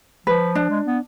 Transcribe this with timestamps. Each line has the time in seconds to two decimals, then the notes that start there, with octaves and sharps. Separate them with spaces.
0.27 F3 B4
0.55 D4
0.70 G#3
0.86 B3